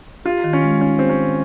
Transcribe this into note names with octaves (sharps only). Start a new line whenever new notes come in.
F4 G4
D#3
C#4
G#3
C#4 D#4
C4 G4
C#4
D#3